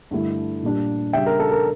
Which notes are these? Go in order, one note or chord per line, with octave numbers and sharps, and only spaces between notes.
G2 D3 A3 E4
A#2 G3 D4
C#3 G3 D4 E5 G5
A#4
A4
A#4